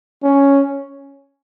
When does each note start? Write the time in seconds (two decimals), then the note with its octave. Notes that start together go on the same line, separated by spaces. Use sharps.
0.23 C#4